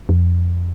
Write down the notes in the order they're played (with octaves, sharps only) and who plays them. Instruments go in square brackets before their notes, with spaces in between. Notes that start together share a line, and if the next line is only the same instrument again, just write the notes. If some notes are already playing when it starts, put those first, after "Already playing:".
[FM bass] F2